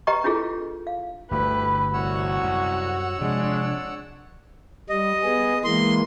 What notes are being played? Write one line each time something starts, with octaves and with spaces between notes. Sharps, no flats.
G4 B4 D#5 G5 A#5 C#6
D4 E4 F4 G#4 A4
F5
G1 D2 A3 E4 G4 B4
C2 F#4 C#5 F#5 E6
F#2
C3 F3 G#3 D4
G3 D#5
B3 G#4
E3 G#3 A#3 C6